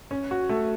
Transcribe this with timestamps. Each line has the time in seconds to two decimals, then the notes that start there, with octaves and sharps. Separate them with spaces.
0.11 C#4
0.31 F#4
0.49 A3